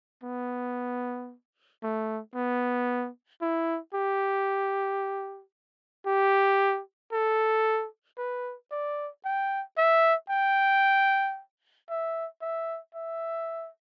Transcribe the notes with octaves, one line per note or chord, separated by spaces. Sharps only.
B3
A3
B3
E4
G4
G4
A4
B4
D5
G5
E5
G5
E5
E5
E5